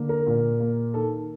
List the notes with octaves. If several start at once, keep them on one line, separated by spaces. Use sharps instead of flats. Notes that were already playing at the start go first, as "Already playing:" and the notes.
Already playing: D3 A#3
A#4
A#2
A#3
D#3 A4